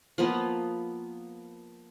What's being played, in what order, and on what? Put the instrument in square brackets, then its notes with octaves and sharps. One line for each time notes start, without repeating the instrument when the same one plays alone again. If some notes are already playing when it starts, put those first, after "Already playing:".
[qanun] F3 A#3 B3